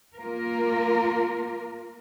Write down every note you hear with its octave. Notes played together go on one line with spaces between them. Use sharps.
A#3 F4 A#4